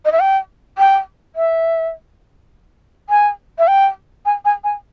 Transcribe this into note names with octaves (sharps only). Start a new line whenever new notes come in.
D#5
E5
G5
G5
E5
G#5
E5
G5
G#5
G#5
G#5